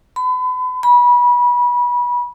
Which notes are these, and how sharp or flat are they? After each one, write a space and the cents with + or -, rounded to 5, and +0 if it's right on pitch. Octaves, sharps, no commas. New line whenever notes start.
B5 +35
B5 -25